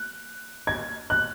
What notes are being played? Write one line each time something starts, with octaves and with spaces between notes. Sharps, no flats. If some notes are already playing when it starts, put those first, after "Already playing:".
Already playing: F#6
G#6
F#6